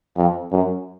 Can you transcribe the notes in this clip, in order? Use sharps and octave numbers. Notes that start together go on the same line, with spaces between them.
F2
F#2